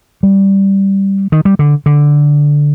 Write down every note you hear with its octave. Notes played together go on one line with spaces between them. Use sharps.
G3
D#3
G3
D3
D3